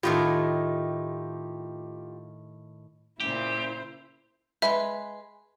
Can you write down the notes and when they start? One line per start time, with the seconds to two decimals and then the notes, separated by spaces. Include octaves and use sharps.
0.03 A2 D#3 A3 F4 G4
3.20 A#2 C#3 E4 G4 C5
4.62 G#3 B4 E5